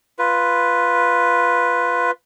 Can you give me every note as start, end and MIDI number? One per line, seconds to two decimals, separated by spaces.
0.19 2.11 65
0.19 2.11 71